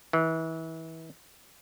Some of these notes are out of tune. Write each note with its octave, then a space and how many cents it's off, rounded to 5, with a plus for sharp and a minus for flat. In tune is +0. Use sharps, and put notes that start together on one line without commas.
E3 -30